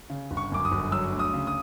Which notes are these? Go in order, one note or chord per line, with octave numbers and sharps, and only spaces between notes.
C#3
G1
C#6
F#2 D6
D#6
G1
F#3 E6
D2
D#6
C#3
D#6